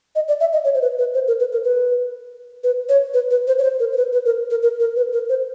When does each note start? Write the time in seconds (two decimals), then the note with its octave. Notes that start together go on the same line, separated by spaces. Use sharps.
0.15 D#5
0.28 D5
0.40 E5
0.53 D#5
0.64 C#5
0.75 C5
0.82 B4
0.99 B4
1.14 C5
1.28 A#4
1.40 B4
1.52 A#4
1.64 B4
2.64 B4
2.89 C#5
3.14 B4
3.31 B4
3.47 C5
3.59 C#5
3.63 C5
3.80 A#4
3.93 C5
3.97 B4
4.13 B4
4.26 A#4
4.50 A#4
4.63 A#4
4.80 A#4
4.96 B4
5.13 A#4
5.29 C5